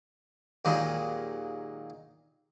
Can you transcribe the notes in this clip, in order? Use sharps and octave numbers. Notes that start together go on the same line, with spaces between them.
D#2 A#2 D#3 F#3 G#3